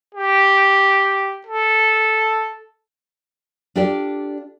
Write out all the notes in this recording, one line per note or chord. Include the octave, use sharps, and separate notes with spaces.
G4
A4
D4 F4 G4 A4 D5